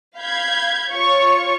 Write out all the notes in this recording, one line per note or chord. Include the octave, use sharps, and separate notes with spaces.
F5 B5 G6 G#6
F4 C#5 C#6